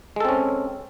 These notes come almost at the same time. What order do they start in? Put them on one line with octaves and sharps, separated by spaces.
G#3 A4 C4 C#4